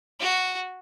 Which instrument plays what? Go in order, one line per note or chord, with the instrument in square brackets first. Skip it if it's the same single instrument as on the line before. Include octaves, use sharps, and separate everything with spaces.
[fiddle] F#4